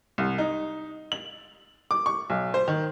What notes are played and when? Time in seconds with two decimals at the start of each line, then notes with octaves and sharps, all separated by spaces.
0.18 C2
0.38 D#4
1.12 F#7
1.91 D6
2.06 C#6
2.30 B1
2.54 C5
2.68 D#3